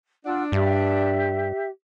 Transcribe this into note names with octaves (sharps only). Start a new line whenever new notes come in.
D4 F4 F#5 E6
G2 G4 E5